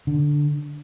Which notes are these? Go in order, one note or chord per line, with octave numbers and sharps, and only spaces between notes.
D3